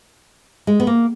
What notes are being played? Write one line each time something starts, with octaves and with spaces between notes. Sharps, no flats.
G#3
B3
A#3